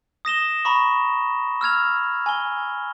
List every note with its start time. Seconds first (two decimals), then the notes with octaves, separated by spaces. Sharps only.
0.25 D#6 A#6 E7 G7
0.65 A#5 B5 C#6
1.61 E6 F6 G#6 F7
2.26 G#5 G7